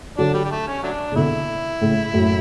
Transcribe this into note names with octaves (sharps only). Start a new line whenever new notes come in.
D3 F#3 D4
G3
G3
A3
C#4
F#3 A3 D4
C#3
B2 D3 E4
A2 C#3
F#2 A2